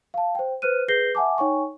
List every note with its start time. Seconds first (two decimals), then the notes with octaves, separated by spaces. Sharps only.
0.14 F5 A5
0.35 C5 G5
0.62 B4 C5 F6 F#6 D#7
0.88 G#4 B4 G6 A#6 C7 G7
1.15 E5 F#5 G#5 A5 D6
1.38 D#4 C#5 G5 G#5 C#6